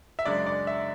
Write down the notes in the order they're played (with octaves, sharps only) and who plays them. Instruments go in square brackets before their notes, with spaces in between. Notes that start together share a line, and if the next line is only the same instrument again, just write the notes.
[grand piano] E5
F#2 C#3 G#3 D4 D5
D5
E5